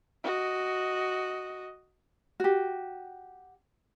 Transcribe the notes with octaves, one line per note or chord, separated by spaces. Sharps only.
F#4 D#5
F#4 G4